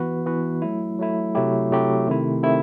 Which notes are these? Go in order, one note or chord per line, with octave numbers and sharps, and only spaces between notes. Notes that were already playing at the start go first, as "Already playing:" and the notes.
Already playing: E3 B3 F#4 B4
E3 B3 F#4 B4
F#3 A3 E4
F#3 A3 E4
C3 F#3 A3 E4 G4
C3 F#3 A3 E4 G4
C3 D#3 A3 E4
C3 D#3 A3 E4